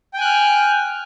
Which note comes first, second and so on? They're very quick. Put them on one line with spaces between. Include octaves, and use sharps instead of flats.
G5 G#5 F#6 F6